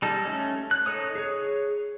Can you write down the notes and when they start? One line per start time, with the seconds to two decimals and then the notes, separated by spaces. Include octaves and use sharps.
0.02 G3 D#4 A4
0.25 A3 C#4
0.71 F#6
0.86 D#4 A4 C#5 D#6
1.15 G#4 C#5